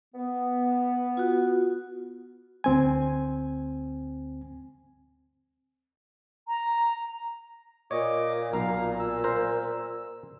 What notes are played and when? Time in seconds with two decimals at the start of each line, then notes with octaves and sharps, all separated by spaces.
0.14 B3
1.17 F4 F#4
2.64 D2 C4 G#5
6.48 A#5
7.91 A#2 C#5 D#5 D6
8.53 B1 F5 A#5
9.00 E6
9.24 A#4 C5